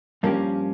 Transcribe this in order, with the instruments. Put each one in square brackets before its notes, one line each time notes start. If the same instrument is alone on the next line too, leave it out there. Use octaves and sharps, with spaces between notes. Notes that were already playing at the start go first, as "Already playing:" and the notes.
[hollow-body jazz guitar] G2 F3 A#3 C#4 G4